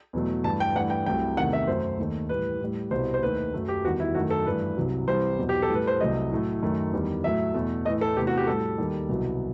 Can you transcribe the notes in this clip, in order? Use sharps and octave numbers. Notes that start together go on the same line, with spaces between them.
E2 B2 F#3 A3
G2 E3 A3 A5
G5
G2 E3 A3 F#5
G5
C2 C3 F#3 A3 G5
E2 C3 D#3 A3 F#5
E5
F#2 F#3 A3 C5
D#2 D#3 A3
A2 E3 G3 B4
A2 G3
C2 B2 G3 C5
C5
D#2 D#3 A3 B4
F#2 F#3 A3
G4
E2 D#3 G3 F#4
E4
F#2 D#3 A3 F#4
A4
G2 E3 A3 B4
C2 C3 F#3
C2 C3 E3 G3 C5
E2 B2 F#3
G4
A4
A2 G3
B4
C5
C2 C3 F#3 A3 D#5
A2 F#3 A3
F#2 D#3 A3
E2 D#3 G3
A2 F#3 A3 E5
E2 B2 A3
A2 E3 A3 D#5
A4
E2 C3 E3 A3 G4
F#4
G4
A2 G3 A4
D#2 D#3 G3
C2 B2 F#3